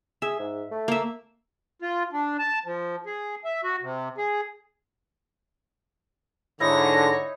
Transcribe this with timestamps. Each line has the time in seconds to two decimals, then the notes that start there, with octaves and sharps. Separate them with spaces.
0.22 G#4 E5
0.39 G#2
0.71 A3
0.88 A#3 E5
1.82 F4
2.13 D4
2.39 A5
2.66 F3
3.06 G#4
3.44 E5
3.64 F#4
3.82 C3
4.18 G#4
6.60 G#2 D3 D#4 E4 C#5 A#6